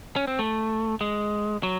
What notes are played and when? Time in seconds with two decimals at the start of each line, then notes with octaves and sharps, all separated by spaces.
0.16 C#4
0.27 C4
0.39 A3
1.01 G#3
1.63 F#3